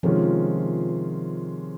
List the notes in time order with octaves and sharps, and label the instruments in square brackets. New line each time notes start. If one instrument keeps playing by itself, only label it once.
[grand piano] C3 D#3 G#3 C#4 F4 [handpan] F3